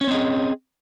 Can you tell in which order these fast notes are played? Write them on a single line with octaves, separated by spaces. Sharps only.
C#4 C#5 C4 D#5 G#4